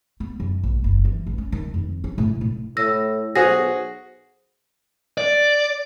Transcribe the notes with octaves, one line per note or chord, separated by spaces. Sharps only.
B3
F#2
A#1
F#1
E3
A1
C#4
D#3
F2
C#4
A2
A2
A2 E6 A#6
B1 F#4 G#4 C5 A#6
D5